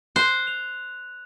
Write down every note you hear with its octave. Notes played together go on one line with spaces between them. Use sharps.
C5 F#6
F7